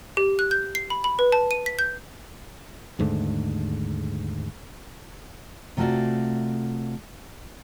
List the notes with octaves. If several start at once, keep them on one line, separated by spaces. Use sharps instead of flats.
G4
F#6
G6
C7
B5
B5
B4
A5
D#7
B6
G6
D#2 G#2 D3 A3
C3 A3 F4 F#4 D5